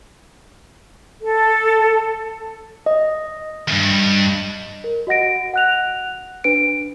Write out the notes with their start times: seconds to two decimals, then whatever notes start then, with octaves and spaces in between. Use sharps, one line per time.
1.23 A4
2.86 D#5
3.68 E2 G2
4.84 A#4
5.07 F#4 D#5 F#5 A#6 D7
5.54 F#5 F#6 F7
6.44 D4 B4 D7